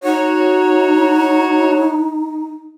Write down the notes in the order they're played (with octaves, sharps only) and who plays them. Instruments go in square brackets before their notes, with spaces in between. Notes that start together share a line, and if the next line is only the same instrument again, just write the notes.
[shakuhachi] D#4 [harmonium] F#4 C#5